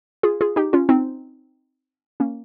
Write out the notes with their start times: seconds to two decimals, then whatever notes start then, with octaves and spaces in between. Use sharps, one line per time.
0.23 F4 G#4
0.41 F4 G#4
0.56 D#4 G4
0.73 C#4 F4
0.89 C4 D#4
2.20 A#3 C#4